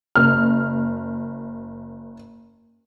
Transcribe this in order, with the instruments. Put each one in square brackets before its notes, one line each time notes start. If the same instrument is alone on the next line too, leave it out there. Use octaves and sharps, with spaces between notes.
[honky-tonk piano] F#1 F6